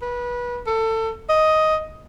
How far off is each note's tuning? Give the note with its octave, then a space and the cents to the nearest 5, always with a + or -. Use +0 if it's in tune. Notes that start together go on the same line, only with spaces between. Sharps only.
B4 -25
A4 +25
D#5 +10